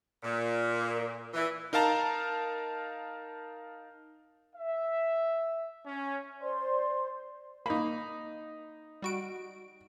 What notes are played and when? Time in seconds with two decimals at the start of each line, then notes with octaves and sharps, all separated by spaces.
0.23 A#2
1.34 E3
1.73 D#4 A#4 F5 A5 A#5
4.55 E5
5.86 C#4
6.41 C5 D5 C6
7.66 A#3 D#4 B5
9.02 G3 F#4 D7